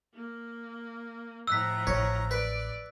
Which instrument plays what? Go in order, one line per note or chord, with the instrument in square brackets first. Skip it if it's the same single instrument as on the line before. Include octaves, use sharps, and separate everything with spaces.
[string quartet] A#3
[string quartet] A2 F3 A#5 [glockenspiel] E6 F#6 B6
[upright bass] A1 [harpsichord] C#5
[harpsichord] B4 [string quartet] D5